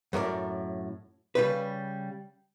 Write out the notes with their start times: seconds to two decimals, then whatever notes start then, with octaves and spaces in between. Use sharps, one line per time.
0.13 F#2 A2 A#4 D5
1.35 C#3 G3 B4